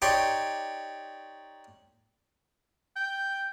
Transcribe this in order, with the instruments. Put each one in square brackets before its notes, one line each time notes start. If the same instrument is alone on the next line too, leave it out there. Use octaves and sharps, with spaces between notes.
[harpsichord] D#4 G4 C#5 D5 C6
[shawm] G5